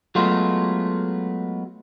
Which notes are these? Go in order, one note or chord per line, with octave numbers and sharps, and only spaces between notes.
F#3 G#3 A3 B3 F4